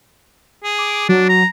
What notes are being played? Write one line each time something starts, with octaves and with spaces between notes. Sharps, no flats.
G#4
D6
D6
F#3 D4
A#5